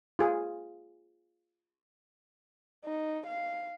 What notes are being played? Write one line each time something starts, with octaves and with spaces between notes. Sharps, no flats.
F4 G#4
D#4
F5